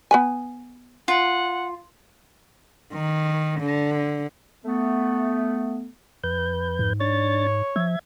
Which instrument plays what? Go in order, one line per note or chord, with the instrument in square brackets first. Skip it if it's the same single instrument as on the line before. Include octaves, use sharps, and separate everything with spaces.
[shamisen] B3 B4 G#5
[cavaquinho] F4 [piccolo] F#5
[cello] D#3
D3
[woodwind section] A3 B3
[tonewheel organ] F2 B4 G6
[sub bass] G#2
[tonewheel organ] D4 A6 [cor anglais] C#5
[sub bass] F3 [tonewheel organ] E5 G#6